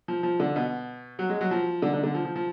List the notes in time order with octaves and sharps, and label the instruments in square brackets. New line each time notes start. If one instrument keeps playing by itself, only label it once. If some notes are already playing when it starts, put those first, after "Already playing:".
[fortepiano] F3
F3
D3
B2
F#3
G#3
F#3
F3
D3
D3
D3
F3
F3
F3